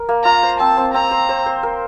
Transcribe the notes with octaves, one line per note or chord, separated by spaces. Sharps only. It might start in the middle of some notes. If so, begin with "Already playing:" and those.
Already playing: A#4
A#3
F4 A#5
C5
C4 A5
C4
C4 A#5
C5
C5
C5
A#4